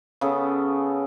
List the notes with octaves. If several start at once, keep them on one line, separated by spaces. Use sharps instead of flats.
C#3 B3 C#4 A4